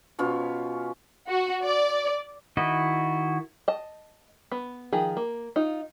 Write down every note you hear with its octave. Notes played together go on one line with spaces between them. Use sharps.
B2 C#4 F4 C#5
F#4
D5
D#3 E4 F#4 D#5
D#5 A5
B3
D#3 F3 G#4
A#3
D#4 F4